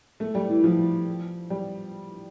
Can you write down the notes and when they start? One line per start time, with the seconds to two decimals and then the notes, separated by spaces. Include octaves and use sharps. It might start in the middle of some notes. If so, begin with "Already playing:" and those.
0.20 A3
0.35 G3
0.49 E3
0.64 F3
1.50 G3